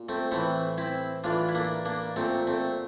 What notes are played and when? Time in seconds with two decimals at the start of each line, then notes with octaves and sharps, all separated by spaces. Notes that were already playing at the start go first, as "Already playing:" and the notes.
Already playing: A#2
0.09 A3 C4
0.32 A2 E3 A3 C4
0.78 C4 E4
1.24 A2 E3 D4 F4
1.49 E4
1.55 A#3 D4
1.85 A#3 D4
2.16 A#2 A3 C4
2.47 A3 C4